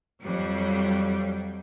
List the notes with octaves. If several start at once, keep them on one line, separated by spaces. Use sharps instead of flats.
F2 F#3 G3